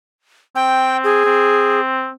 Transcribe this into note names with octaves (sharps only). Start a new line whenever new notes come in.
C4 G5
G#4
C4